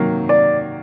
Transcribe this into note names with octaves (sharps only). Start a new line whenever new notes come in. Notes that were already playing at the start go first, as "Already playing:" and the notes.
Already playing: C3 D#3 F#3 A#3
D5